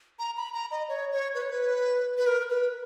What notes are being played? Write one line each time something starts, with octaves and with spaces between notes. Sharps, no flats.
A#5
B5
A#5
D#5
C#5
C#5
B4
C#5
B4
B4
A#4
B4